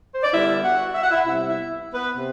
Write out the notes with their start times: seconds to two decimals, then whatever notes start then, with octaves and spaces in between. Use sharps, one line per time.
0.14 C5
0.24 D5
0.34 D3 G3 B3 E4 E5
0.64 F#4 F#5
0.94 E5
1.03 F#5
1.11 E4 E5
1.25 C3 G3 B3 E4 E5
1.48 E4 E5
1.94 B3 B4
2.16 C3